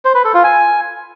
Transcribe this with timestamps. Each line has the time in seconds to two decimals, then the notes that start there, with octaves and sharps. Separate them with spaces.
0.05 C5
0.15 B4
0.24 A4
0.34 F4
0.44 G#5